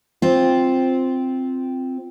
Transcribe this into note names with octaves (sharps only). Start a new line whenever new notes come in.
C4 F4